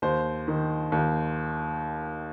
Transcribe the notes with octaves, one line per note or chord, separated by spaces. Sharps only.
D#2 C5
D#3
D#2